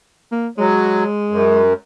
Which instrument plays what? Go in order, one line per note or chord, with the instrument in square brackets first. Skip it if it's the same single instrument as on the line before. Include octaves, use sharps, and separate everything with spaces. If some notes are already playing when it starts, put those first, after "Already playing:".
[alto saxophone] A#3
[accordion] F#3 [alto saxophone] G#3
[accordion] F#2